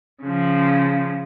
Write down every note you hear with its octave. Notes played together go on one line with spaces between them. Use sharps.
C#3 F3